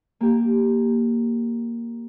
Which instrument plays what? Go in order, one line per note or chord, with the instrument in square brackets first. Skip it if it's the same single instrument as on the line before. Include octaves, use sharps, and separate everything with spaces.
[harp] A#3 G4